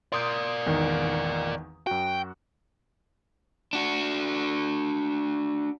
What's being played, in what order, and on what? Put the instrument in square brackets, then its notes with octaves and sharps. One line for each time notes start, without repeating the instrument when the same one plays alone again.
[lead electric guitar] A#4 D5 [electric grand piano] C6 D#6 G6
[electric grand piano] G#1 E2 D#3
[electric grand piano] F#2 F#4 [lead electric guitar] G5
[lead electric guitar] D4 F#4